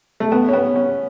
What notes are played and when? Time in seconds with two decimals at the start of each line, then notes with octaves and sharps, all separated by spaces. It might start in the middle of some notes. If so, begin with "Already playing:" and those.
0.20 A3
0.32 B3
0.49 C#4
0.53 B3
0.76 C#4